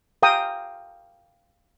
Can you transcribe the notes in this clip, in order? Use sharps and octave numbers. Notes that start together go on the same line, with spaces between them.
F5 G5 A#5 D#6